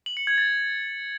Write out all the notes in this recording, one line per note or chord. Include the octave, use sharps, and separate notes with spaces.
F#7
C#7
G#6
A6